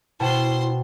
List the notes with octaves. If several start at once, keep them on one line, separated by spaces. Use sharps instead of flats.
B2 E4 C5 G5 A5 C6